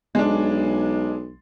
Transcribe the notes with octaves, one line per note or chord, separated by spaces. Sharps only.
B1 G#3 D4